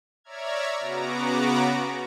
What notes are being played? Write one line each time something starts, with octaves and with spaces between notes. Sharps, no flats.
C#5 D5 E5 A#5 F6 G#6
C#3 B3 F#4 A#5 D6